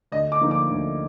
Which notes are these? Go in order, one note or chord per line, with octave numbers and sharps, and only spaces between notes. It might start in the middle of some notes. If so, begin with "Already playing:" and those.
D2 D#5
D6
D3 F3 A#3 D#4
D6
D2